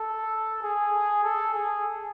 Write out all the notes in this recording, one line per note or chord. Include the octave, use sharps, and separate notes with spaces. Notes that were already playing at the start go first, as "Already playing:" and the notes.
Already playing: A4
G#4
A4
G#4